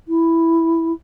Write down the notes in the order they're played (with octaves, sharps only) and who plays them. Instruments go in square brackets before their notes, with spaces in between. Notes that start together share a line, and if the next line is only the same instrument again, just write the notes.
[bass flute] E4